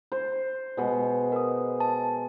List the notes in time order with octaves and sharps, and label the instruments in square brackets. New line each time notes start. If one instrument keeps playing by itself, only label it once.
[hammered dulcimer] C5
B2 G#3
[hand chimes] A#4 D#6
A5